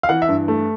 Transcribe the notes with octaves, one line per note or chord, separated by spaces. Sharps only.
F5
E3 F#5
E5
G2
A3